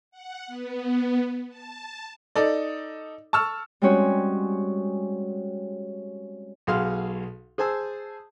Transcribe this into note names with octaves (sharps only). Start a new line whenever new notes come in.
F#5
B3
A5
D#4 A4 D5
A5 C#6 E6 F6
G3 G#3 C4 C#4 F#4 C#5
B1 F#4 G#4 F5 C6 F6
G#4 C5 G#5 A5 E6